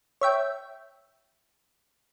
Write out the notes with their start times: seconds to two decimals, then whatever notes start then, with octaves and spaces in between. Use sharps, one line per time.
0.21 C#5 E5 G5